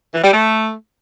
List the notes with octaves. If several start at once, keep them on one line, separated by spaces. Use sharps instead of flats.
E3
G3
A3